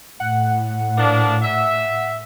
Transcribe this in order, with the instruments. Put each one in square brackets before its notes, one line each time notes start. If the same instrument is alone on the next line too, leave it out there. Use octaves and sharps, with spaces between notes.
[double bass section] A2 [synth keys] F#5
[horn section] F3 A#3 D4
E5